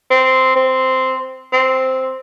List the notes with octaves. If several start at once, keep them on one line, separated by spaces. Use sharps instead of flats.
C4
C4
C4